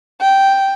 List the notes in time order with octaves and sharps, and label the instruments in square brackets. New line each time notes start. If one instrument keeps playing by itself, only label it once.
[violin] G5